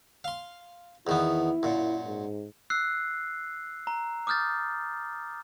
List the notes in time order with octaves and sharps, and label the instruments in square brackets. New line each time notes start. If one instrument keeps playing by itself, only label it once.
[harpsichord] F5 C6
[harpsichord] E2 D#3 B3 [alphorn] E4
[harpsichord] F#2 A#2
[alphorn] G#2
[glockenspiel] E6 F#6 C7
A#5
D6 D#6 F6 G6 A6